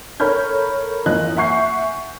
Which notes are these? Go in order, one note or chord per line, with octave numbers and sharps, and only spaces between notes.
A4 A#4 C#5 B5 F6 G6
F#1 E3 F3 A#4 D#5 F#6
E5 F#5 G#5 C#6 G6 C7